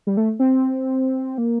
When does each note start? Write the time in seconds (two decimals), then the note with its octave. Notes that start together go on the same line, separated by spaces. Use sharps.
0.07 G3
0.17 A3
0.39 C4
1.38 A#3